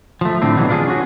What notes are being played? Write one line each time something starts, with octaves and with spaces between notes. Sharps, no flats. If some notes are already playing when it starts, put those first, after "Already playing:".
F3 A3
A2 D3 C4
B2 E3 F#3 G3
D4 F4 G#4
C#4 F#4